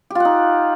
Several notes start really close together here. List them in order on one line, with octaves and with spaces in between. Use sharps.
G4 F4 F#5 D#4